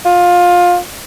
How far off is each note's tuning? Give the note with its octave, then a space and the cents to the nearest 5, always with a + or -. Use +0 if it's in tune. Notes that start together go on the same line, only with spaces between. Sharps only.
F4 +20